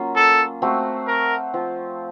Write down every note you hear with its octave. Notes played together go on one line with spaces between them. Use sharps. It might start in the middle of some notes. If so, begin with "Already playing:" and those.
Already playing: F#3 A#3 C#4 F4
A4
A3 C4 F#4
A#4
F3 C4 F4